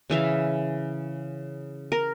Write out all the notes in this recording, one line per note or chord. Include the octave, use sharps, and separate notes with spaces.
C#3 E3 E5 F5
A#4